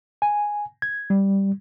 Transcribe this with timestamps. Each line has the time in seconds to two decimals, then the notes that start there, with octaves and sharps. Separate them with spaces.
0.22 G#5
0.82 G#6
1.10 G3